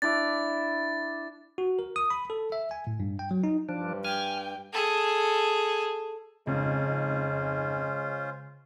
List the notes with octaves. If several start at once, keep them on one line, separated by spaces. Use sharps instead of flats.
D4 E4 D6 A6
F#4
A#4
D#6
B5
A4
E5
G#5
A2
G2
G5
F#3
D#4
G2 F3 D4
G5 G#5 F6
G#4 A4
F2 G#2 C#3 G#3 C#4 F4 C5